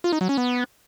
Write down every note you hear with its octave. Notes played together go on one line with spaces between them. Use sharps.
F4
D#4
F#3
C#4
B3